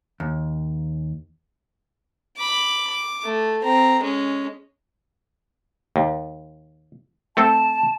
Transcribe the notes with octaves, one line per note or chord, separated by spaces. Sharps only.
D#2
B5 D6
D6
A3
C4 A#5
G#3 C#4
D#2
A3 C4 A4 A5